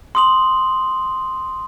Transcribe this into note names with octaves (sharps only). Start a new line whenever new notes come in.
C6 D#6 F#7